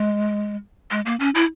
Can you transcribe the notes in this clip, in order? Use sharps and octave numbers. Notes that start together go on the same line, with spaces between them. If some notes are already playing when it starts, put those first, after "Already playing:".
Already playing: G#3
G#3
A#3
C#4
E4